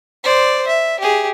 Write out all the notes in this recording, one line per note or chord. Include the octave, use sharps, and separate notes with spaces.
C5 D5
E5
G4 G#4